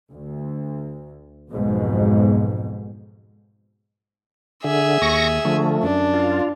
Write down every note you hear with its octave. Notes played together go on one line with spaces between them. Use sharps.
D2
B1 F2 G#2 B2
D3 G#4 E5
D#2 C#6 A#6
D3 F3 A3
F#2 D4
F4